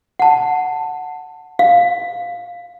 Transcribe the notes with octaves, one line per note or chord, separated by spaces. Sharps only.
F#5 A5
F5